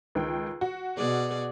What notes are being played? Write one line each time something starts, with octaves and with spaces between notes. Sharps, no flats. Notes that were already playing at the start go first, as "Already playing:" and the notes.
C#2 D#3 G5
F#4
B2 G#4 D5